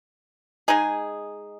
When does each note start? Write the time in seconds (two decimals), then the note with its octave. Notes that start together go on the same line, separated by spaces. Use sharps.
0.68 G#3 D#4 G#4